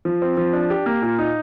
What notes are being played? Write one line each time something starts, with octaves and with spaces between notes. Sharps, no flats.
F3
C4
F3
D4
G4
A#3
A#2
D#4